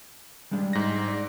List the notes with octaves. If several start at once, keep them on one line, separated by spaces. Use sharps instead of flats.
G3 G#3 D4
G#2 A#6
D5